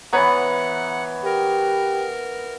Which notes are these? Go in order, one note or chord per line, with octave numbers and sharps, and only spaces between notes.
E3 B3 B4 C#5 F#5 A#5
G4 A#4